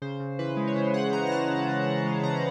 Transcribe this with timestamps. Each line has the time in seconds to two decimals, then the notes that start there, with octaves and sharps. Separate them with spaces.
0.02 C#3 C5
0.20 C#3
0.39 E3 B4
0.57 G#3
0.67 C#5
0.76 C#3 C5
0.94 C#3 F#5
1.13 E3 A#5
1.27 A#5
1.31 G#3 A5
1.49 C#3
1.69 C#3
1.86 E3
2.05 G#3
2.23 C#3 A#5